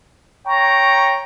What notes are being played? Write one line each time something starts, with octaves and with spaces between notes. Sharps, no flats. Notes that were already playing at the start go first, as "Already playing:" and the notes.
C#5 G5 A#5 C#6